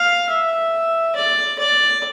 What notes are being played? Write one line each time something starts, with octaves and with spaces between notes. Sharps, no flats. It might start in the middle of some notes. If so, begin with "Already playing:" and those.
Already playing: F5
E5
D5
D5